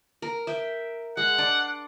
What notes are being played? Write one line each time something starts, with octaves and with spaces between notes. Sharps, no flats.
A#4
E5 G5
G#3 F#5
D4 D5 C6